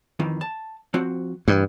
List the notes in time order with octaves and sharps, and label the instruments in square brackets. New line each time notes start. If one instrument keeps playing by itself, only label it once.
[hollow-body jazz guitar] F2 D#3 E3
A5
F3 C4 F#4
[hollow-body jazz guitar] C2 E3 [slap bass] G2